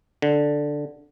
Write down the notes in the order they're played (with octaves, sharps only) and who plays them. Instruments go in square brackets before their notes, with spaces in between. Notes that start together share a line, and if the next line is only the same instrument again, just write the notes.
[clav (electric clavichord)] D3